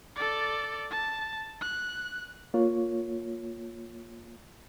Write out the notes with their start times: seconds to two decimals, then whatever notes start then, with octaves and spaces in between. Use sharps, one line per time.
0.16 A4 D5
0.91 A5
1.62 F#6
2.54 A#3 F4 C#5